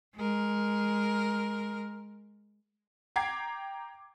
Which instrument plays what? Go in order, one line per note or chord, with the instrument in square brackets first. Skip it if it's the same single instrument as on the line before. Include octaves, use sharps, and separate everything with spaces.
[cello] G#3 A#4
[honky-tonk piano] G5 A#5 D6 G#6 C7